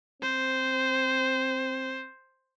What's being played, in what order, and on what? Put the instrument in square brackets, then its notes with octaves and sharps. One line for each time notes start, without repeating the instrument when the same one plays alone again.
[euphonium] C4 [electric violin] C5